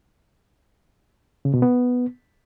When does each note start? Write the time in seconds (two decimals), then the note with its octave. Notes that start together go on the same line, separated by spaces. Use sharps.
1.45 C#3
1.54 B2
1.62 B3